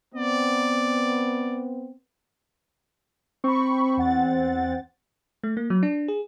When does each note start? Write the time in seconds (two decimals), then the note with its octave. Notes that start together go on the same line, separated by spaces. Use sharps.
0.15 B3 C4 D5
3.44 C4 B5 C#6
3.97 E2 F#5 A6
5.44 A3
5.57 A#3
5.70 F#3
5.83 D4
6.08 G#4